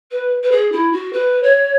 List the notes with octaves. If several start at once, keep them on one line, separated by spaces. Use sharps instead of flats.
B4
B4
G#4
E4
F#4
B4
C#5